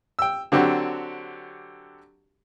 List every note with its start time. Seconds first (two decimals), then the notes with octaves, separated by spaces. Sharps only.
0.19 G5 E6
0.52 D3 F#3 C4 D4 F#4 G4